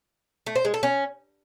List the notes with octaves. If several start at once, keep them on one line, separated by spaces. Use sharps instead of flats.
A3
C5
G#3
A4
C#4